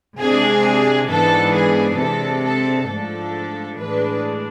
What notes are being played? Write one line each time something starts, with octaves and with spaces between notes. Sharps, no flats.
C3 G#3 D4 G#4
G#2 E3 B3 D4 A4
G#4
C3 G#3 D4 A4
A4
G#2 F3 A3 D4 A4
A2 E3 G#3 D4 B4